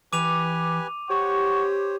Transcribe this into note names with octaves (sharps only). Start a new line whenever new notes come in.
E3 G4 B4 G#5 D6 D#7 F7
G4 C5 C#5 F#5 C#6